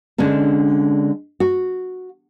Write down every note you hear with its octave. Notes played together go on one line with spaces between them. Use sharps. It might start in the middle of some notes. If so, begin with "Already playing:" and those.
D3 G#3 C#4 D4 A4
F#4